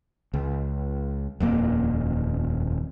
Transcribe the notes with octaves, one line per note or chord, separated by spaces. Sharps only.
C#2
D#1 F2 A#3